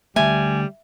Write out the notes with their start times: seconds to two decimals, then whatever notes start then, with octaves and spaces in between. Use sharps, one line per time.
0.16 D3 G3 A3 E5 G#5